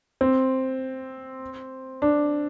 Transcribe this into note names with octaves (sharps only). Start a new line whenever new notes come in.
C4
D4